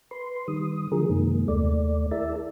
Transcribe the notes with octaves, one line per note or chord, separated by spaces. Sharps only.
B4 C6
D#3 G3 D#6
D3 F3 F#3 G#3 G#4 A#4
F#2 C3 D#3 G#3 A#3
D#2 A3 D5
E4 G#4 A#4 D5 E5 A5